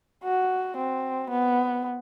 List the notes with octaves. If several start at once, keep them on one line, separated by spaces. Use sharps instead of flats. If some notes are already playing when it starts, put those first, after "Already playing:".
F#4
C4
B3